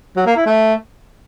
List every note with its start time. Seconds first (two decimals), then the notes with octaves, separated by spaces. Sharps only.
0.17 F#3
0.26 A#3
0.36 E4
0.46 A3